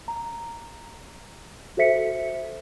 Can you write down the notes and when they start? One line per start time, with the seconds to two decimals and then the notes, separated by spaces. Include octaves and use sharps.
0.08 A#5
1.77 F#4 A4 C5 E5 B6 C#7